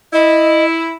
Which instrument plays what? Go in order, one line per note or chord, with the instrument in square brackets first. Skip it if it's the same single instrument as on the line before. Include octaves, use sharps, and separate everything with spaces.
[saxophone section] E4 [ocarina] D#5